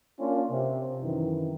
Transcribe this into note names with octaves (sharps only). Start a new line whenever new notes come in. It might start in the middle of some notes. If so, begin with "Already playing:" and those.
A#3 C#4 D4 F4
C3
F#2 D#3 E3